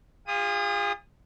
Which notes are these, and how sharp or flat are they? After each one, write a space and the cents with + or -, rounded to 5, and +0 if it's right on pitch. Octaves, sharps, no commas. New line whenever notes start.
F4 +0 G#4 -45 D#6 +0